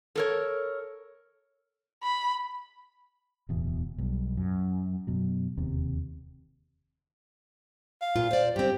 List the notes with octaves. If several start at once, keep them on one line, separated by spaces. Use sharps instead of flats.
A4 A#4 C#5
B5
D1 E2 B2
B1 G2
F#2
F#2 B2 F#3
E1 D#2 C3
F5
A#2 F4
C5 D5
G2 C4 G4